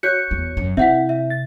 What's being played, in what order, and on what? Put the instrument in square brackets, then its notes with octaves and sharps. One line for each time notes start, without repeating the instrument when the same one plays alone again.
[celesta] F#4 F#6 G6 [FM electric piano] C#5 C#7
[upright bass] E2
F#2
[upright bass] C3 [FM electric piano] C4 E4 [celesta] E5 F#5 B6
[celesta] E5
[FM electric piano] A6